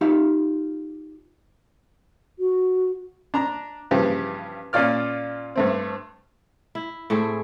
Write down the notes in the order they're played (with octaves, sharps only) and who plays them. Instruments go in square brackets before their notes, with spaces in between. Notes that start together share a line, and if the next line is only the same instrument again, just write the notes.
[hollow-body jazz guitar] D#4 F4 G4 E5 F5
[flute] F#4
[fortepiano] D4 A#5
G2 C#3 E3 F3 G4
A#2 C#4 F4 D5 F6
G2 A3 C4
[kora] E4
A2 A3 C4 G#4